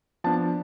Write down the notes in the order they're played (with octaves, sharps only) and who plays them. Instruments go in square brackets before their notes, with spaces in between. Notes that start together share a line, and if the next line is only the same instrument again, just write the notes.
[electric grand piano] F3 B3 D4 A5